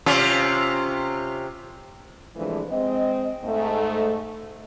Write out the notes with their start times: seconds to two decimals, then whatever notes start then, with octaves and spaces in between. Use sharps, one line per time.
0.06 C3 C#4 F4
2.36 C3 E3 F3 G#3 A3 D4
2.70 G#3 C4 D#5
3.45 G#2 A3